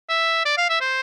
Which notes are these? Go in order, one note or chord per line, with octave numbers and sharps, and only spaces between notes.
E5
D5
F5
E5
C5